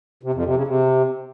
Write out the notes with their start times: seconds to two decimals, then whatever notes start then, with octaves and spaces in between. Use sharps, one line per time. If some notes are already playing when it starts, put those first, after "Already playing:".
0.23 C3
0.34 F2
0.45 C3
0.56 C#3
0.67 C3